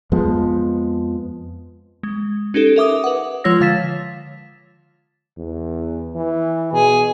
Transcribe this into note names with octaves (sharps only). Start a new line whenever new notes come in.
F2 F3 G#3 B3
G#3
C#4 D#4 G4 A4
A#4 E5 D6 D#6
B4 F#5
F3 G#3 F4 C#5 E6 A#6
D3 F5 A6 B6 E7
E2
E3
B2 G#4